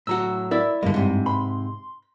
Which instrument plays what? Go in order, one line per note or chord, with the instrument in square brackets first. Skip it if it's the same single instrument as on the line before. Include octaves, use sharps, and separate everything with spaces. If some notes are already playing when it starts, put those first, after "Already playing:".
[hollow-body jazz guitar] A2 F#3 F#4 [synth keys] A#5 E6
[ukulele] E4 D5 E5 [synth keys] A#4 E6
[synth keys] G2 G3 G#3 [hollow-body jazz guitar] D3 A#3
[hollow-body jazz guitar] G#2 C3
[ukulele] B5 [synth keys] C6